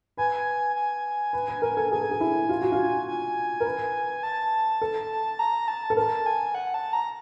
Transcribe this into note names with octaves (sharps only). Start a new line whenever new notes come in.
B4 G#5
G#5
B4
B4
A#4
A4
G#4 G#5
A4
G#4
E4
F4
F#4
F4
G#5
A#4
B4
A5
A4
A#5
A5
A4
A#4 A5
G#5
F#5
A5
A#5